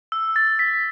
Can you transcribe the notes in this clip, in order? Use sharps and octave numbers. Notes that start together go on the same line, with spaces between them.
E6
A6
B6